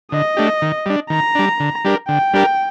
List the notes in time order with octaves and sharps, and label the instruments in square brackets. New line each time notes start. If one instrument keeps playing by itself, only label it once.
[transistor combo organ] D3 [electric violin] D#5
[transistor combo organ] A3 D4 G4
D#3
G3 D4
[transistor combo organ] D#3 [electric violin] A#5
[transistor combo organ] G3 D4
D3
G3 D4 G4 A#4
[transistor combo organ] D3 [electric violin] G5
[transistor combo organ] G3 D4 G4 A#4